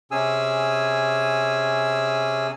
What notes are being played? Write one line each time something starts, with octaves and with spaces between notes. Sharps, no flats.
C3 C#4 G#4 G#5 E6